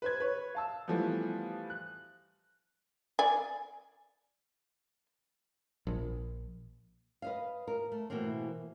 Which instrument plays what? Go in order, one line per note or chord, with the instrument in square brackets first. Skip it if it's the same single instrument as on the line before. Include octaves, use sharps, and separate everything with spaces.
[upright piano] B4 C5 G#6
B4 C#5
F5 A5 E6
E3 F3 G3 A3 B3
F#6
[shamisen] D5 G#5
[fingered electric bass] A#1
[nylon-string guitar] B4 D#5 F5
A#4
A3
B2 E3 A3 A#3 C4